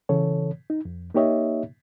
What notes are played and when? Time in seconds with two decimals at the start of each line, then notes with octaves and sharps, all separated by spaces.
0.09 C#3 E3 A4 C#5
0.70 D#4
0.85 F2
1.14 A#3 D#4 G4 C#5 D#5 E5